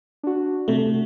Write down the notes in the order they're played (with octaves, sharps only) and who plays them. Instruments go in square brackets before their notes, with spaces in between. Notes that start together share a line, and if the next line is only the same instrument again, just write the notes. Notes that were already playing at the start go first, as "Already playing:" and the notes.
[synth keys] D4 F#4
[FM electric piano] C3 A3